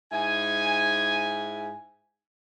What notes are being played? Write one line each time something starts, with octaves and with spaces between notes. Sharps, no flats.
G#2 E4 G#5